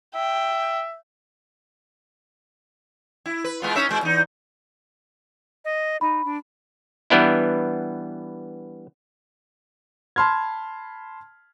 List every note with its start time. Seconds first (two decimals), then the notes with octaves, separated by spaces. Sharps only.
0.15 E5 G5
3.26 E4
3.44 B4
3.62 G#3 B3 F4
3.75 C#4 D#4 E5
3.89 B2 G#3
4.03 E2 D#4
5.65 D#5
6.01 D#4 B5
6.25 D4
7.10 E3 G3 B3 D4 E4
10.16 A5 B5 C6 F6 G#6